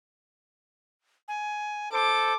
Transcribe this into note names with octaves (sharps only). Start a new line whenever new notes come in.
G#5
A4 C5 D6